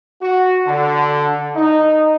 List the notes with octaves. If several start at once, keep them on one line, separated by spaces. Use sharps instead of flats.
F#4
D3
D#4